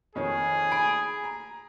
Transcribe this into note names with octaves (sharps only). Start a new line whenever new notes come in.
F2 D#3 G#4 C#5
G#5 B5 D7
A#5